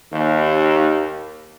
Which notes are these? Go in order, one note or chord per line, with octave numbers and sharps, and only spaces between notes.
D#2